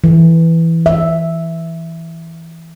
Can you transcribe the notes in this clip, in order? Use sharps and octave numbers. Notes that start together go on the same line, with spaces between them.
E3
E5